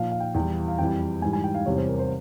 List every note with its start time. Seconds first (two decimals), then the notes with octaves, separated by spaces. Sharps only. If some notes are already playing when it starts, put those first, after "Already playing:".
Already playing: A#2 F3 F5
0.12 F5
0.20 G5
0.34 E2 E3 G3 G5
0.68 F5
0.78 F2 E3 G3 G5
1.22 G#2 E3 G3 G#5
1.33 G#5
1.44 G5
1.55 F5
1.66 E2 C3 G3 C#5
1.77 C5
1.87 A#4
1.99 C5